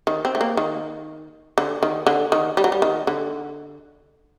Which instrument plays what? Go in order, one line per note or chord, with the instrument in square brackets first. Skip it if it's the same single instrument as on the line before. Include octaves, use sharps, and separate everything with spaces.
[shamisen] D#3
C4
A3
A#3
D#3
D3
D#3
D3
D#3
G3
F#3
G3
D#3
D3